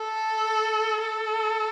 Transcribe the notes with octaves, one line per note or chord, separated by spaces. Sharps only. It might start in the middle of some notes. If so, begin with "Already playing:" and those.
Already playing: A4
A4